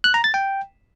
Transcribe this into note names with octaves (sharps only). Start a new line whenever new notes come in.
F#6
A#5
A6
G5